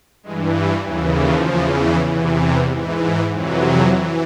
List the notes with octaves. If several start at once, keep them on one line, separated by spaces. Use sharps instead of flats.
G2 E3 G#3
G3
D#2 C#3 E3 F#3
F3
E2 C#3 E3
E2 C3 E3
G#2
E3
F2 C3 E3 F#3
E3